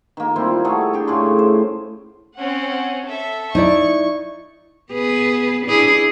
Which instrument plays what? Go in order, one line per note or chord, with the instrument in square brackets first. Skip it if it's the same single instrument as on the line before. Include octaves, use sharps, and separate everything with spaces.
[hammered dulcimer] D#3 A#3
G3 C4 E4 F4
A3 G#4 C#5 F#5
D4 G4
A2 C#3 C#4 C6
C5
[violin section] C4 C#4 F#5
A4 E5
[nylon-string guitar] D#4 E4 D5 [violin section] C#6
[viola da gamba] B3 G#4 B4
D4 E4 G#4